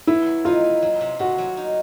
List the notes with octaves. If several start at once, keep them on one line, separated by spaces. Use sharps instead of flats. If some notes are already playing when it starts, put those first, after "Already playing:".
B3 E4
F#3
D#4 F4
D#4
F#3
C3
C3 F#4
F#3
D#4